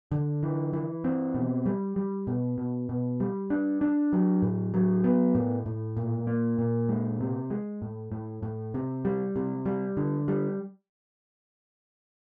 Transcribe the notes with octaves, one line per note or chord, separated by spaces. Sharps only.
D3
E3
E3
C4
B2
G3
G3
B2
B2
B2
G3
D4
D4
F#3
A2
F#3
B3
A2
A2
A#2
A#3
A#2
G#3
C3
G#3
A2
A2
A2
C3
G3
C3
G3
D3
G3